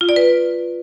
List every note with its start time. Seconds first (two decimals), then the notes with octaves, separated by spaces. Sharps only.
0.01 F4
0.09 D5
0.16 B4